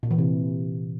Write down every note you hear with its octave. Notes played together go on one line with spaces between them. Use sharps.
A#2
E3
C3